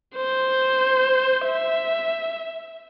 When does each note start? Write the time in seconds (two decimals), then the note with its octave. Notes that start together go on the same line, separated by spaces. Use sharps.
0.16 C5
1.46 E5